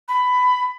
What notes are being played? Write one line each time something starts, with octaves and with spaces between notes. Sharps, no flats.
B5